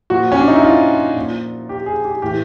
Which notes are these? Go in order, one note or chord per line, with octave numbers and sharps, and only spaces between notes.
A#2 F3 F#4
C#4
D4
D#4
E4
F4
A#2 F3
G4
G#4
G4
A2 E3 G4